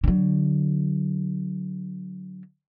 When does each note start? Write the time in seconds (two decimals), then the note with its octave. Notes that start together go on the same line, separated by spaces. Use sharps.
0.04 D3 F#3